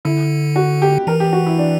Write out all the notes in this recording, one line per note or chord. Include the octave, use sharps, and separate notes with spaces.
D3 E4
F#4
G4
E3 A#4
G4
F#4
E4
D4